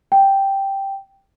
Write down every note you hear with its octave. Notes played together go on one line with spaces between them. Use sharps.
G5